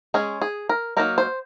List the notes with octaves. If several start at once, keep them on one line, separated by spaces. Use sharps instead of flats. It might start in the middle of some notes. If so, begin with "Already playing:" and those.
G#3 C#4 G#4
G#4
A#4
F#3 A#3 D#4 A#4
C5